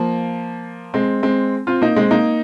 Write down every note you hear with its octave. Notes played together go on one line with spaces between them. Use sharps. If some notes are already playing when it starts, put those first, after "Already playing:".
Already playing: F3 A#3
G#3 C4
G#3 C4
C4 F4
A#3 D#4
G#3 C4
A#3 D#4